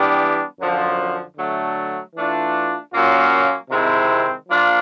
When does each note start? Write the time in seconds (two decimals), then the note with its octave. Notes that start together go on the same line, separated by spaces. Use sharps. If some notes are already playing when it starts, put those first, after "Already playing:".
Already playing: E3 G3 B3 D4 G4
0.59 F#2 D3 F3
1.37 D3 F#3 A3
2.15 E3 A3 D4 F4
2.93 A#2 F#3 A#3 C#4 F4
3.70 C3 D#3 G#3 C4 E4
4.48 F3 A#3 D4 F4